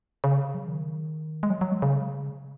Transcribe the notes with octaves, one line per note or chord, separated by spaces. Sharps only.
C#3
F#3
D#3
G#3
F#3
F#3
G#3
C#3